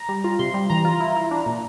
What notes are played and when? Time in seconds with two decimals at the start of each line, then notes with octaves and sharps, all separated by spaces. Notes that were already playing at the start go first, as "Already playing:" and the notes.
Already playing: A#5
0.09 G3
0.24 F4
0.39 C3 C6
0.54 G3
0.70 E3 A#5
0.85 F4
1.00 E4
1.16 E4
1.31 D4
1.46 A#2